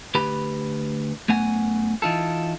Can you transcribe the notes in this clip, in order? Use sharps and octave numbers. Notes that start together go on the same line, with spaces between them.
D2 G4 B4 B5
F#2 A3 B3 F#5 G#5
E3 D#4 F4 A4